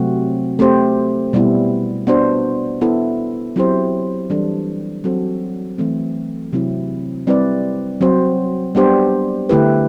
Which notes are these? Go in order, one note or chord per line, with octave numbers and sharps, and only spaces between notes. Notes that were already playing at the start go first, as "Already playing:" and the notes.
Already playing: C3 F#3 A3 C4 F#4
A3 C4 G4 C5
B2 G3 B3 E4
B3 D4 F#4 C5
B3 E4 A4
F#3 C4 E4 G4 C5
E3 G3 D4 A4
F#3 C4 F#4 A4 C5
E3 A3 C4
C3 F#3 C4 E4
G3 C4 E4 B4 D5
F#3 C4 F#4 C5
G3 B3 D4 G4 C5
D3 A3 E4 G4 B4